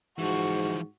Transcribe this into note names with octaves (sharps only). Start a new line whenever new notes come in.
G#2 E3 F3 F#4